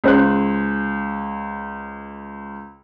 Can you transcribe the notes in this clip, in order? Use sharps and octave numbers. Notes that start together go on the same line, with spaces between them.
C#2 C5 F#6